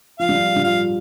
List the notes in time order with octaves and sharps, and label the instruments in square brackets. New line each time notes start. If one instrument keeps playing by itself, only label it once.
[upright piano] F3 [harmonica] F5
[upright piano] G3
F3
G3
[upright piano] F3 [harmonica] F5